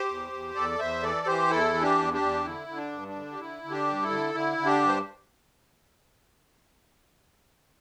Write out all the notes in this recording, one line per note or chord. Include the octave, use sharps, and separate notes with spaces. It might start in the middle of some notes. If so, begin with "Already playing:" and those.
Already playing: G4 C5
E2
E2
E2 A4 D5
E2 C5 E5
E3 A4 D5
E3 G4 C5
E2 E4 A4
E3
D4 G4
E2
D4 G4
E2
D3 E4
D3
D4
G2
D4
D3
G4
D3 E4
D3
D4 G4
G2
E4 A4
D3
D3 E4
D3
D4 G4
G2
C5